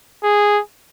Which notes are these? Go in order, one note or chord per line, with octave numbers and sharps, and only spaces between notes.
G#4